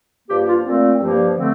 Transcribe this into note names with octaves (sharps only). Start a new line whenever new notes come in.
G2 F3 A#3 G4
F4
A#2 A3 C4
G2 F3 A#3
D3 A3 C4